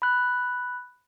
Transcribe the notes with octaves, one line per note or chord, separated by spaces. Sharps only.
B5 F#6